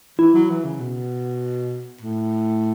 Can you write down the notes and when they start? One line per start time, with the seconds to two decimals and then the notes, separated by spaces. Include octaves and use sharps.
0.19 E3 E4
0.34 F#3
0.50 E3
0.65 C#3
0.80 B2
2.01 A2